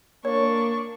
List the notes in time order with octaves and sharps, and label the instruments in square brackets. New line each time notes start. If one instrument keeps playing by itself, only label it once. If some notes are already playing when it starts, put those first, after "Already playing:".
[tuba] A#3 [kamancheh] D4 C#6 [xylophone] C#5